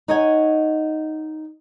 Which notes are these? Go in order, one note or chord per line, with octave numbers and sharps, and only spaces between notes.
D#4 C#5 D#5 F#5 G#5